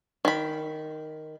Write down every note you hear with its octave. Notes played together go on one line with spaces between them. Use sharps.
D#3 B5